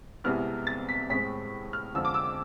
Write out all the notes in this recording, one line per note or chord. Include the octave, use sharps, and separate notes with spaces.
C2 C3 G#3 B3 E4 F6
A6
B6
A2 G#3 C4 B6
F6
F2 D3 F3 G#3 E6
D6
E6